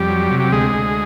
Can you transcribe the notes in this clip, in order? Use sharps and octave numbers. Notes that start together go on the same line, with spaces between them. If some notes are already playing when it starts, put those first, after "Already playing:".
Already playing: F2 G3 G4
F#3
C3
G4
D2 G#3 G#4
D2